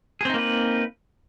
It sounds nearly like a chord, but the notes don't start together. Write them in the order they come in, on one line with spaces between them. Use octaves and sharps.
G#4 C4 D#4 A#3 B4